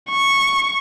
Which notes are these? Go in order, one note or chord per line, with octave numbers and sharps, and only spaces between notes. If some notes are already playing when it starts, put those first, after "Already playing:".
C#6